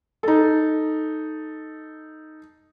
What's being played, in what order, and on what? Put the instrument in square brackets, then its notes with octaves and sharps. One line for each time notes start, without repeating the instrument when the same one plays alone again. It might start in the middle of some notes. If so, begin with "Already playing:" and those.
[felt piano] D#4 A4